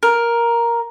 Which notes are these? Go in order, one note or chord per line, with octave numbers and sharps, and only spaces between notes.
A#4